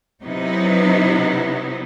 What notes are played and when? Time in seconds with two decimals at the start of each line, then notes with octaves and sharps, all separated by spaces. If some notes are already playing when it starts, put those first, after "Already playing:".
0.21 C3 F#3 B3 D#4 E4